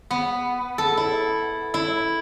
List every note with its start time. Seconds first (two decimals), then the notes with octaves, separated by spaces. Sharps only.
0.11 B3
0.78 A4
0.97 E4
1.74 E4